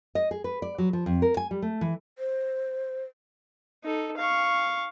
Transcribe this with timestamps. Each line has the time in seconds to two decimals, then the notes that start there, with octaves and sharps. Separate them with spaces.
0.15 D#5
0.31 G#4
0.44 B4
0.62 D5
0.78 F#3
0.93 F3
1.06 F2
1.22 A#4
1.37 G#5
1.51 G3
1.62 A3
1.81 E3
2.18 C5
3.84 D#4 A4
4.18 F5 C#6